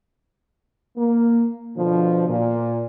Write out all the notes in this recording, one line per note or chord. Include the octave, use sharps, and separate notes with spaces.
A#3
B2 D3 F3
A#2